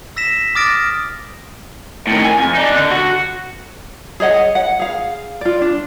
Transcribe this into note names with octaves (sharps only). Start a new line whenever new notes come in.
E6 A#6 B6 E7
D6 D#6 F6 A6 A#6 D7
A2 D#3
G#5
F2
D4 D#4
D3
F#4
G#4 C#5 D#5 F#5
F#5
G#4 F5
F4 D5
D4